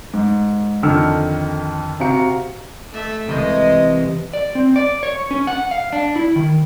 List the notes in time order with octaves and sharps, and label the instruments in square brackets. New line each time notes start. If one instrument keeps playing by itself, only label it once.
[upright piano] G#2
F2 D3 D#3 E6 F6 C#7
C3 F#4 F5 A#5 C#7
[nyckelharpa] A3 E5
[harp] C2 E3 [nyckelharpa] G#3 D#5
[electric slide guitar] D5
C4
D5
C#5
C#4
F#5
F5
D4
E4
D#3